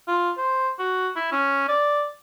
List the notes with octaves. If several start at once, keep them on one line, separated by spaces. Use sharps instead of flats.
F4
C5
F#4
E4
C#4
D5